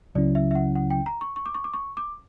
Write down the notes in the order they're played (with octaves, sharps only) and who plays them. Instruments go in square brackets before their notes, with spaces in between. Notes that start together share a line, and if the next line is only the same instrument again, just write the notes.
[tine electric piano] C#2 C#3 F#3 C#4 E4 [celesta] D5
[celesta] E5
E5
F#5
F#5
G5
A#5
C#6
C#6
D6
C#6
D6
C#6
D6